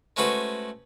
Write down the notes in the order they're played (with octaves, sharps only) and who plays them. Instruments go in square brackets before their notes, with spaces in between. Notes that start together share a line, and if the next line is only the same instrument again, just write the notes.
[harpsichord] G#3 A3 C#4 F#4 B4 C5